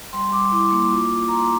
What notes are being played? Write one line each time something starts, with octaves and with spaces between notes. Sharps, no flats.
G3 C6
G3 D6
E4 D6
A#3
F4
F4
A#5
F4 C6
D6